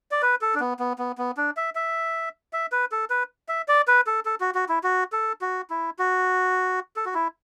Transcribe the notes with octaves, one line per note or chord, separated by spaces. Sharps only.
D5
B4
A4
D4
B3
B3
B3
B3
D4
E5
E5
E5
B4
A4
B4
E5
D5
B4
A4
A4
F#4
F#4
E4
F#4
A4
F#4
E4
F#4
A4
F#4
E4